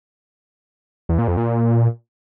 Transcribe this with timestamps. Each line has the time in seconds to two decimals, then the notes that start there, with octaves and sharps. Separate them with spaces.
1.09 E2
1.18 A#2
1.28 F2
1.37 A#2